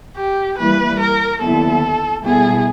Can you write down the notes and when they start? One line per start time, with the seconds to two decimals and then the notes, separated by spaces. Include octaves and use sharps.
0.17 G4
0.58 E3 G3 A#3 B4
0.99 A#4
1.41 D#2 D3 F#3 B3 E4 A4
2.24 B2 G3 B3 E4 G#4 A4